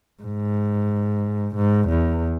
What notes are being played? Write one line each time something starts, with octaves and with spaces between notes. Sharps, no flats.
G#2
G#2
E2